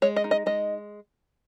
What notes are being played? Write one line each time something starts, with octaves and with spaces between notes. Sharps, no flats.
G#3 C#5
D#5
D#4
D#5
G#3 D#5